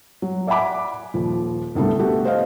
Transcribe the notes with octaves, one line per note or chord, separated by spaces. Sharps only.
F#3
D5 E5 F#5 G#5 B5 D6
D#1 F3
C2 D3 G3 A3 B3
A3 B3 F#4 G4
C5 D#5 F5